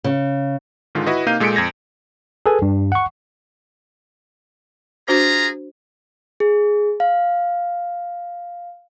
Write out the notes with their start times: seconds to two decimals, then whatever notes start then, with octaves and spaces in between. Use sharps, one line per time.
0.04 C#3
0.95 G#2 D3 D#3 G#3 F4
1.06 E4 F#4 B4 D#5
1.26 C3 A#3 D#4 F5 G6 D#7
1.40 A#2 G#3 A4 B6 C#7 D7
1.56 F2 G#6 A#6
2.46 G#4 A4 B4 G#5
2.62 G2
2.92 F#5 C#6
5.08 D4 F4 F#4 G#4 C5 A#5
6.40 G#4
7.00 F5